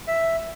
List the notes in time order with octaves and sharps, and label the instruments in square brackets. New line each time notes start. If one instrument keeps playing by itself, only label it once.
[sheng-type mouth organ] E5